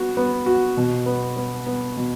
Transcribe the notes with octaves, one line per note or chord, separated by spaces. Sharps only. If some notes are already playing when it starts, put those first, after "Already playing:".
Already playing: B3 F#4
B3
F#4
B2
B3
B3
B3
B2